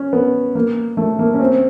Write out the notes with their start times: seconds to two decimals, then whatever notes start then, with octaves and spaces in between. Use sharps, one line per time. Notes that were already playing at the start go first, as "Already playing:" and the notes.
Already playing: C#4
0.13 B3
0.55 A#3
0.97 A3
1.19 A#3
1.34 C#4
1.40 C4